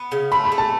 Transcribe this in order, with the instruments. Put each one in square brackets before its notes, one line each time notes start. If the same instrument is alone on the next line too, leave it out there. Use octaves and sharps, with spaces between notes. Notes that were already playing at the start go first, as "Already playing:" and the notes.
Already playing: [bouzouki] B3
C#3
[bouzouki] A3 [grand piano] B5
[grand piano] B5
[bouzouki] A3
[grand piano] A5